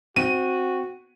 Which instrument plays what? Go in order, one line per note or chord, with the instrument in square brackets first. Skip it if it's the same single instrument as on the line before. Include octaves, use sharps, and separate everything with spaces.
[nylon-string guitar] C4 [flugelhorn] F#4 [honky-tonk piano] D#7